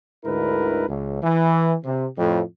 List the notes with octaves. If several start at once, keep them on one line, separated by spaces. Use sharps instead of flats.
D2 G#2 D3 E4 A#4 B4
C#2
E3
C3
F2 A2